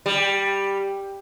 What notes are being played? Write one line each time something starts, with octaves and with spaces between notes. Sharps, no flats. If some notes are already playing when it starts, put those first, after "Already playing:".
G3